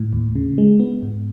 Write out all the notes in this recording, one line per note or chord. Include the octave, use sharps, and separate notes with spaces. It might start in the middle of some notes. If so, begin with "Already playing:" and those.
Already playing: A2
D#2
C#3
G#3
B3
G#2